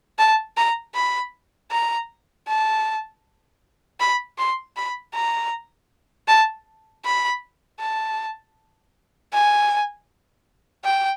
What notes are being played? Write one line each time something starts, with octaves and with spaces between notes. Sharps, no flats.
A5
A#5
B5
A#5
A5
B5
C6
B5
A#5
A5
B5
A5
G#5
G5